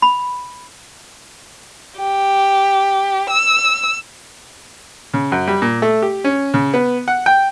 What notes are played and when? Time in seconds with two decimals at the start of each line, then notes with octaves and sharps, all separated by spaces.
0.02 B5
1.97 G4
3.30 E6
5.14 C#3
5.32 F#2
5.47 G3
5.62 A#2
5.82 A3
6.02 G4
6.24 C#4
6.54 C#3
6.74 B3
7.08 F#5
7.26 G5